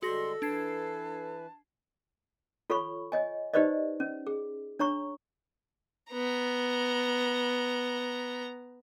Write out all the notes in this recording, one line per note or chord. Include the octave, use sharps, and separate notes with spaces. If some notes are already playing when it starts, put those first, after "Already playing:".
D3 G3 G#3 F#4 A4 C6 A#6
E3 D4 B4 A5 G#6 C7
F4 A4 C#5 B5 C#6
C#5 D#5 G#5
D#4 G4 B4 C5 D5 D#5
C#4
G#4
D4 C#5 A#5 C#6
B3 A#5